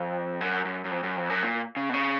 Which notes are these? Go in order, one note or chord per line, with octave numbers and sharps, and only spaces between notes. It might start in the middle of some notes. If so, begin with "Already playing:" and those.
Already playing: F2
F#2
F#2
F#2
F2
F#2
F2
F#2
A#2
C#3
B2
C#3